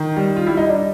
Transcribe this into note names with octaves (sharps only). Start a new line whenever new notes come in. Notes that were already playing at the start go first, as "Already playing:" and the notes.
Already playing: D#3
G3
F4
G3 E4
D#4
D4